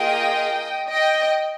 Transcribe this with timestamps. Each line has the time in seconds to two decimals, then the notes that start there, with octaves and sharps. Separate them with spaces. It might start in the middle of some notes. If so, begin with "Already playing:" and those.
Already playing: A#3 F4 G#4 D#5 G5
0.90 D#5 G5